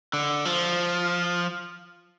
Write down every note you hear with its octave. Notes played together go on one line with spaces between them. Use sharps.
D3
F3